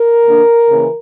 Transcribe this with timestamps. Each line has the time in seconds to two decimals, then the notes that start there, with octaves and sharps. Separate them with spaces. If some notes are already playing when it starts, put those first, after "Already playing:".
Already playing: A#4
0.24 D3 A#3 D4
0.70 C#3 E3 A#3